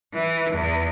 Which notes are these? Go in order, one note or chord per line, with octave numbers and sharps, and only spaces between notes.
E3
E2